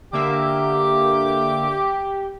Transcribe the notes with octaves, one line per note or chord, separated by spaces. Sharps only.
D3 A#3 G4 E5 D6